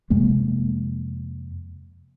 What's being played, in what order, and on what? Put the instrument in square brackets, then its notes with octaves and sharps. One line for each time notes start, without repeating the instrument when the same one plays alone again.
[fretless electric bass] F2 C3 G#3 A#3